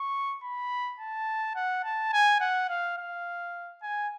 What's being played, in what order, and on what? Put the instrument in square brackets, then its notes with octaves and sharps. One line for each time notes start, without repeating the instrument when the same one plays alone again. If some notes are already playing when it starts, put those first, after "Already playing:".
Already playing: [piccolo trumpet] C#6
B5
A5
F#5
A5
G#5
F#5
F5
F5
G#5